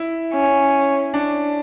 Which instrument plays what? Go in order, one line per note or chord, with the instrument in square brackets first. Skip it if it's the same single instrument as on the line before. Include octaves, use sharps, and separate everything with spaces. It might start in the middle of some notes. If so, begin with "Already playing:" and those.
Already playing: [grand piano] E4
[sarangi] C#4
[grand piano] D4